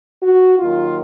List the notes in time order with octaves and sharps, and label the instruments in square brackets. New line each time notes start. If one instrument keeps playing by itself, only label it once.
[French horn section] F#4
D#2 D#3 F#3 F4